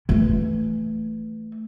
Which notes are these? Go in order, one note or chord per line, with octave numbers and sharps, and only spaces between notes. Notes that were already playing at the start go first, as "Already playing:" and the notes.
E3 A3